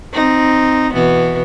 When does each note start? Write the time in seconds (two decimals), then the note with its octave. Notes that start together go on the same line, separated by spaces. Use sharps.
0.13 C4 D#4
0.93 B2 E3 B3